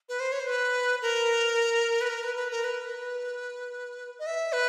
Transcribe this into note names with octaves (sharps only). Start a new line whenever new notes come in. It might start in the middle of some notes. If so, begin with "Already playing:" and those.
B4
C5
C#5
C5
B4
A#4
B4
A#4
B4
B4
A#4
B4
D#5
E5
B4